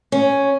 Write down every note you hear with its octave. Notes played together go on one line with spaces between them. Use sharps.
C#4